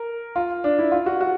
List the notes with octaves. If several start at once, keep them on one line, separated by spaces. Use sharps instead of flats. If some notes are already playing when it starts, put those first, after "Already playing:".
Already playing: A#4
F4
D4
E4
F4
F#4
F#4